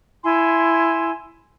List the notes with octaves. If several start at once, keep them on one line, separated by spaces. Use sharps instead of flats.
E4 G#5 C6